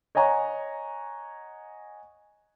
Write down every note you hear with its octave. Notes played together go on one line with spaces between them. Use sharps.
C#5 D#5 F#5 G#5 A#5 C#6